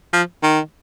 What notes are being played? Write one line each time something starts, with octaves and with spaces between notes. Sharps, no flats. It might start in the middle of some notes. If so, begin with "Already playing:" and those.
F3
D#3